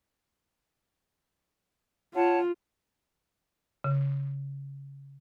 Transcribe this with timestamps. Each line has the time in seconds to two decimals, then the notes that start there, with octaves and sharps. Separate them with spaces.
2.14 F4 C#5 F#5 A5
3.84 C#3